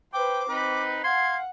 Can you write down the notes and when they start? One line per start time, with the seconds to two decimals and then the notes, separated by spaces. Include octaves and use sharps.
0.13 B4 C5 G5 D6
0.49 C4 D#4 B4
1.04 F5 F#5 C6 G#6